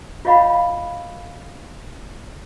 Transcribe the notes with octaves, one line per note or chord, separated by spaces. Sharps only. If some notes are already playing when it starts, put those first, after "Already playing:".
F4 C#5 D#5 F5 F#5 B5